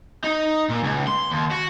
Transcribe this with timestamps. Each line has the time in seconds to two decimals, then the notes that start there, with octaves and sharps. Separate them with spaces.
0.24 D#4
0.70 A#2
0.83 C#2
1.07 C6
1.31 D#2
1.51 F#4